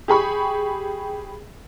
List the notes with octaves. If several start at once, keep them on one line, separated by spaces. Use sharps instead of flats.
G4 G#4 B5 C#6